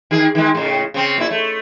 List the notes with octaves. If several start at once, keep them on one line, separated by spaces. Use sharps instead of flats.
D#3 G#4
D#3 G#3
A2 C#3
C#3 C4
A#2 E4
A3